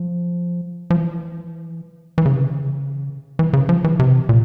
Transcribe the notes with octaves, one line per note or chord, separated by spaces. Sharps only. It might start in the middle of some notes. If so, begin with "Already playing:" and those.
Already playing: F3
F3
E3
E3
C#3
C3
C#3
E3
C#3
F3
E3
C3
A#2